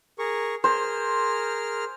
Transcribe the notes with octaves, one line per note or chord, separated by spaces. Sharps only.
G#4 A#4 C#6
G#4 A#4 C5 F6